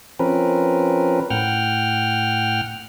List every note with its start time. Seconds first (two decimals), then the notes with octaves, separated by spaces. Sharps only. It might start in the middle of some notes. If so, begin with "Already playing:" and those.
0.19 F3 C4 C#4 A#4 B4
1.30 A2 F#5 G5 F6